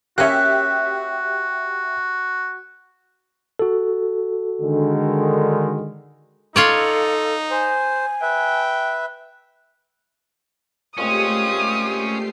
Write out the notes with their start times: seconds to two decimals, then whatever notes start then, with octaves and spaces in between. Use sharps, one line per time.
0.18 A#3 C#4 F#4 G4 E5 F#6
3.59 F#4 A4
4.61 D3 D#3 G#3
6.56 D#4 F4 A4 C#5 D5
7.51 C5 G#5
8.22 B4 E5 G5
10.98 A#2 G#3 A3 C4 C#4 G4 D#6 C7